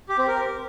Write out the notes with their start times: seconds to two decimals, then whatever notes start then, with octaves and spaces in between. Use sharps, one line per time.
0.09 G4
0.18 C4
0.28 A#4